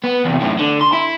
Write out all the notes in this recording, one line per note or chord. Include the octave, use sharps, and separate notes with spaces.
B3
E2 C3
F#2 A2
D3
C6
E4